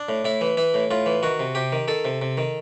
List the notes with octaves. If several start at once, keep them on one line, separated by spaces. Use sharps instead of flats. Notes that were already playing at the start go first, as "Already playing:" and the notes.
Already playing: D4
A2
A2 E4
E3
E3 E4
A2
A2 F4
E3
D#3 F#4
C3
C3 G4
D#3
D#3 A4
C3
C3
D#3